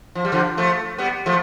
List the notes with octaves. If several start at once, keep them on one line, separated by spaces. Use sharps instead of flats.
F3
G3
D3 F3
F3 A3
G3 B3
F3 A3